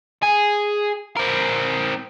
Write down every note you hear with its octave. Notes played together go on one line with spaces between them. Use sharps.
G#4
C4 A#4